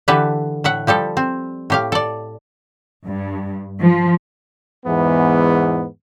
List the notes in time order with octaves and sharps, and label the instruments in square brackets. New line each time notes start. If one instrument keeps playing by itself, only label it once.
[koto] D3 E3 G4 A4 B4
A2 E5 F#5
F3 G3 G4 A4
C4
A2 G4 F5
A4 D5
[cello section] G2
F3
[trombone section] E2 G#2 E3 B3